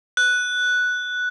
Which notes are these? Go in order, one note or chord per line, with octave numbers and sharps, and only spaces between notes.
F#6